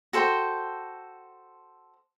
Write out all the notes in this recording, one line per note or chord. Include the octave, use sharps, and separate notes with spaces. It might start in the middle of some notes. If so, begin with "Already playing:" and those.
F#4 A4 C5 G5